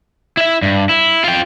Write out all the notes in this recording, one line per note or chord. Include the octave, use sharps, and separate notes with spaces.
E4 E5
G2
E4
F4 G5